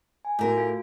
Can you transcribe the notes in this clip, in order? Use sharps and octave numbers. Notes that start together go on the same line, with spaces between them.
G#5
A2 A3 F#4 A#4
F4